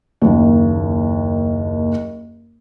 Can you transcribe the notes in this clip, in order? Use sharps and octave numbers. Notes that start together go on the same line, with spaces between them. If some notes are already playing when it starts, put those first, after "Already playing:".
F#1 D#2